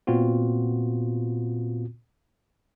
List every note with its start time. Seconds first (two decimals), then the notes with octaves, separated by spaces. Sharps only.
0.07 A#2 B3 C4 F4 F#4